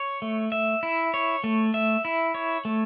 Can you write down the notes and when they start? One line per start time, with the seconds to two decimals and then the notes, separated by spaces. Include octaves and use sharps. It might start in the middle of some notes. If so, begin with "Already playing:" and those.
Already playing: C#5
0.22 A3
0.52 E5
0.83 E4
1.14 C#5
1.44 A3
1.74 E5
2.05 E4
2.34 C#5
2.65 A3